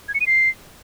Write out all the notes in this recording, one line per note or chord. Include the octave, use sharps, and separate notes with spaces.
G#6
C#7
D#7
C7